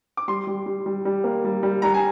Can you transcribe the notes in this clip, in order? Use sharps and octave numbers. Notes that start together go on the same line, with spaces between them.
D6
G3 C6
G3
G3
G3
G3
A#3
G3
G3
G3 A#5
G#5